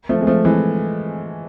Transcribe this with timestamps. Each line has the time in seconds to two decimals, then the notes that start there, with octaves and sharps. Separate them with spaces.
0.09 F3 A3
0.21 G#3
0.27 F3 A3
0.45 E3 G#3